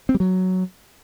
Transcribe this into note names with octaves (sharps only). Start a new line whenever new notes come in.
C4
G3
F#3